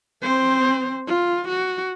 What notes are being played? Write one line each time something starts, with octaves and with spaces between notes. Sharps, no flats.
C4 C5
F4
F#4